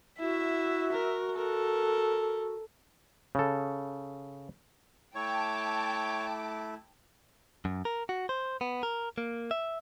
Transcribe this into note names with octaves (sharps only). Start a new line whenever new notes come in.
E4 F#4 E5
A#4
A4 A#4
C#3 A4
A3 E4 C#5 G5 A5 D6
F#2
A#4
F#4
C5
B3
A#4
A#3
E5